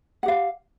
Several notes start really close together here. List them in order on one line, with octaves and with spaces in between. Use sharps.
F#5 G4 F5